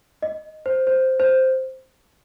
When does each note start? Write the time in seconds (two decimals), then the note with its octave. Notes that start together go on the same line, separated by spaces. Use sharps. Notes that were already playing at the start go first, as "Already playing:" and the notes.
0.22 D#5
0.66 C5
0.87 C5
1.20 C5